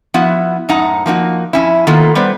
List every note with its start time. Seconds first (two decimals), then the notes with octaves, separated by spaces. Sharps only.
0.14 F3 B3 E4 F#4
0.69 F#2 A2 D#4 F#5 A#5
1.06 F3 A#3 D#4 F#4
1.53 F2 C#4 E4
1.87 D#3 A#3 B3 F4 A4
2.15 G3 B3 B4 C5 D5